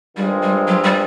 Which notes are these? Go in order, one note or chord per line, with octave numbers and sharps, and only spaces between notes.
G2 D#3 G3 G#3 C4 F4
G3
F#3
G3